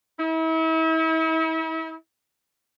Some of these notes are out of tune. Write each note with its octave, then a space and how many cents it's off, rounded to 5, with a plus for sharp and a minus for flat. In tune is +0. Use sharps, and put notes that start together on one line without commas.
E4 -40